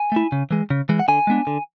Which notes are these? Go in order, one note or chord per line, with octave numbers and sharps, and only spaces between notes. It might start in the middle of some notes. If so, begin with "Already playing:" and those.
Already playing: G#5
A3 E4
C#3
E3 G#3
C#3
E3 G#3
F#5
D3 G#5
G#3 B3 D4
D3